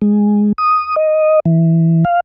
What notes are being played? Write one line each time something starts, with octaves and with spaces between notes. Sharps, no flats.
G#3
D#6
D#5
E3
F5